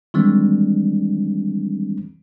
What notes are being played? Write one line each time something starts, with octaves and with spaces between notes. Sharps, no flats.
D#3 E3 G3 G#3 C4 D4